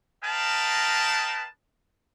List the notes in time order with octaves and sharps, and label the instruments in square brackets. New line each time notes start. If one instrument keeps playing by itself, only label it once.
[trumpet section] A#4 B4 D#5 F5 G5 A5